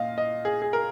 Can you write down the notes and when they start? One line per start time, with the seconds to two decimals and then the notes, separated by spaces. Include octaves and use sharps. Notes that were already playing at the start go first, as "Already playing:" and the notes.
Already playing: A#2 D#5 F5
0.18 D#5
0.45 G#4
0.62 G#4
0.73 A#4